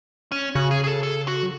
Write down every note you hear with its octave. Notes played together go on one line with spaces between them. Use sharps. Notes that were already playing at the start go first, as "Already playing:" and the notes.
C#4
C#3 F#4
G#4
G#4
A4
A4
F#4
F#3